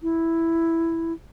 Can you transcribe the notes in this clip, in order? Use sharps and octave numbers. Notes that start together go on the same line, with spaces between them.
E4